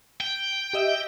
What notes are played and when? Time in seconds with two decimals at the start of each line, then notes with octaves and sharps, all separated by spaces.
0.21 G5
0.73 G4 D#5 E5